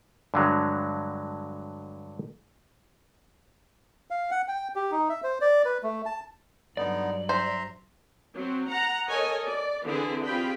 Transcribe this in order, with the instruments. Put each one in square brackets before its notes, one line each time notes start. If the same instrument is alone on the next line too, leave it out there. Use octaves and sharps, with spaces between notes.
[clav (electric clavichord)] G2 D3 F#3 G#3
[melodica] F5
F#5
G5
G4
D#4
E5
C5
D5
B4
A3
A5
[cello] G2 F#3 [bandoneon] D3 B3 D#4 [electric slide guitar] D5
[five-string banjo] C5 [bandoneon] E5 A#5 C6
[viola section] F#3 C4
F#5 A#5
A4 A#4 C#5 D#5 G#5
D5
D3 E3 C4 E4 G#4
C4 F4 G4 G#4 G5 B5